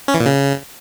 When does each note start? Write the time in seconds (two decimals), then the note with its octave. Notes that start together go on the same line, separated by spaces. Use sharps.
0.08 C#4
0.14 E3
0.20 A#2
0.26 C#3